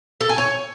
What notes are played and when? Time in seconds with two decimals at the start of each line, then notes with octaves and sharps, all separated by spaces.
0.21 A4
0.29 G#5
0.38 C#5